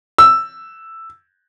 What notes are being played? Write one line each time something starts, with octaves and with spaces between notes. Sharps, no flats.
E6